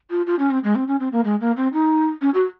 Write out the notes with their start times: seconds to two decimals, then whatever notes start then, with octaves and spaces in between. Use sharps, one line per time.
0.11 F4
0.27 F4
0.39 C#4
0.51 C4
0.64 G#3
0.75 C4
0.88 C#4
1.00 C4
1.12 A#3
1.25 G#3
1.41 A#3
1.57 C4
1.73 D#4
2.21 C#4
2.34 F#4